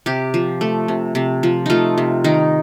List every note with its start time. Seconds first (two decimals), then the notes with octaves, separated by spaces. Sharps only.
0.06 C3 G4
0.34 F3
0.61 A3
0.88 C3
1.15 C3
1.43 F3
1.66 A3 D#4 F4
1.98 C3
2.24 D#3 D#4